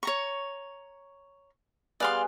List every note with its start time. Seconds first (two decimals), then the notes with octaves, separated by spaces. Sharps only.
0.03 C#5 A#5 C#6
2.00 G3 B3 G#4 D5 F5 C6